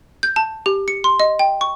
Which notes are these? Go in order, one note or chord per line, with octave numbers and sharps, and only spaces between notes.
G6
A5
G4
C#7
C6
D#5
G5
C#6